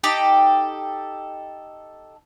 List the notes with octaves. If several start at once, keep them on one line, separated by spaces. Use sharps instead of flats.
D#4 G4 A4 G5